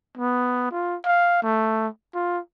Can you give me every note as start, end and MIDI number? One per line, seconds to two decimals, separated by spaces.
0.17 0.67 59
0.71 0.97 65
1.05 1.39 77
1.42 1.87 57
2.14 2.39 65